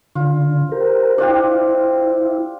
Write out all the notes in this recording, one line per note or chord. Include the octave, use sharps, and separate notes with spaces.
D3 F4
G4 A#4 C5
D4 E4 F4 G4